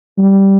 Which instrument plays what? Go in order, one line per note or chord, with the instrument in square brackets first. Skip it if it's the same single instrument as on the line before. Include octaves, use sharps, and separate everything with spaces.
[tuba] G3